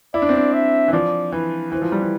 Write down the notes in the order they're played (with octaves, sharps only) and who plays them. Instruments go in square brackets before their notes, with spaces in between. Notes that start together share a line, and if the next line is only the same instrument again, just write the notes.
[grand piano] E4 [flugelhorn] D5
[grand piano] D4
C4
D4
[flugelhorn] E5
[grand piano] E3
[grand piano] F3 [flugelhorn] D5
[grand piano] E3 [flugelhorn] B4
[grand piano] E3 [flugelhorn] C5
[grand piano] F3
G3
E3